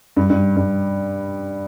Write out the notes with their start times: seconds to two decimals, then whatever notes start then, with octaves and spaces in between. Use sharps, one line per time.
0.17 G2
0.30 G2
0.56 G2